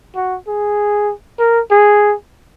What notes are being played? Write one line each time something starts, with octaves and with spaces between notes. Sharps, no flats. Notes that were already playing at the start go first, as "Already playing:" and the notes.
F#4
G#4
A#4
G#4